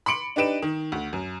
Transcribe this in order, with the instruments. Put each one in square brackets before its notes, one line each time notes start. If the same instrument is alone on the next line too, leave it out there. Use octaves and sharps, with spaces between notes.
[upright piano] B5 C6 D6 C#7 D7 F#7
D4 D#4 G4 B4 D7 E7
D#3
D2
F#2